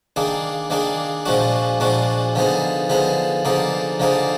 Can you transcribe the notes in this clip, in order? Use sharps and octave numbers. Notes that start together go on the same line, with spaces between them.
D#3 A#3 D4 G#4
D#3 A#3 D4 G#4
A#2 F3 G#3 D4 F#4
A#2 F3 G#3 D4 F#4
D3 F3 B3 D#4 G#4
D3 F3 B3 D#4 G#4
D3 F3 A#3 D#4 G#4
D3 F3 A#3 D#4 G#4